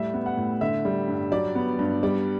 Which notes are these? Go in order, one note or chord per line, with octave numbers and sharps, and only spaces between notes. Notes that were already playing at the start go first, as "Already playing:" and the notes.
Already playing: A2 G3 E5
B3
F#5
A2
D3 E5
G3
G2
F#3 D5
B3
G2
G3 D5